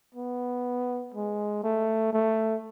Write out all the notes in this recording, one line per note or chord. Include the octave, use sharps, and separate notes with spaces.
B3
G#3
A3
A3